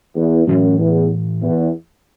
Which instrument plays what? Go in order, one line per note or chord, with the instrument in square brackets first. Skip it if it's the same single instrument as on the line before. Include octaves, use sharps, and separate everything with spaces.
[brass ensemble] E2
[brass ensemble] F#2 [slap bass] A2 E3 A3
[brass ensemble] E2
E2